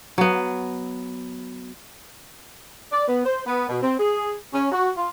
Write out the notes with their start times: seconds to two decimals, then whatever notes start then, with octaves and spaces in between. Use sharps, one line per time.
0.18 F#3 B3
2.92 D5
3.08 B3
3.26 C5
3.46 B3
3.69 B2
3.82 C4
3.99 G#4
4.53 C#4
4.72 F#4
4.97 F4